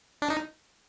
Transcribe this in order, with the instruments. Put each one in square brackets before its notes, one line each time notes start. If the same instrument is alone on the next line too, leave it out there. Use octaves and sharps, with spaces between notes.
[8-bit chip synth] D4
D#4